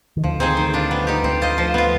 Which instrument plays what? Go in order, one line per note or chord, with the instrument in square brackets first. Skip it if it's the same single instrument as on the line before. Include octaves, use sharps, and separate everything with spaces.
[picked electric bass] D#3
[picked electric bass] D2 D3 [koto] F3
[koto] C4 D#4 G#4 C5
D#3
G3 D4 F4
B3
D#4 G4
[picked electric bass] D2 D3 [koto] C4
[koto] F4 C5 D#5
F3
B3 F4